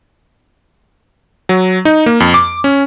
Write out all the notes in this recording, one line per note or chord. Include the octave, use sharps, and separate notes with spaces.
F#3
D#4
A#3
F2
D6
C#4